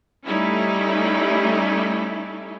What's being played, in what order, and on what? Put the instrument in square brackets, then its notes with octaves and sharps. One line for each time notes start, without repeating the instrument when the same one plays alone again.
[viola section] G3 A3 C#4 D#4 E4